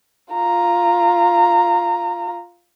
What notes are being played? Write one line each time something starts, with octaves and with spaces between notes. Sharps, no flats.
F4 A#5